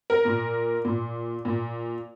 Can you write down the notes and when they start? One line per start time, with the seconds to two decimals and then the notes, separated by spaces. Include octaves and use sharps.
0.10 A#4
0.25 A#2
0.85 A#2
1.45 A#2